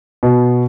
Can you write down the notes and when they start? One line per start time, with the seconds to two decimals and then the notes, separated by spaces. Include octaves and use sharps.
0.23 B2